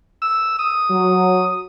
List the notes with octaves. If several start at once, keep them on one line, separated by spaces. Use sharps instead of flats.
E6
D#6
F#3